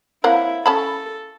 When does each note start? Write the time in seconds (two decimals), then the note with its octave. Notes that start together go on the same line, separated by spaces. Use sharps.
0.24 A#3 C4 E4 C#5 F5 F#5
0.66 C#4 A4 A5 B5 C#6